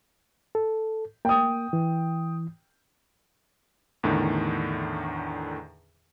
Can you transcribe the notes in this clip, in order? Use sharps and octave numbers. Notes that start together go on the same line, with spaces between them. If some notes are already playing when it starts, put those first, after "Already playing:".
A4
A#3 G5 D#6
E3
E2 A2 D3 D#3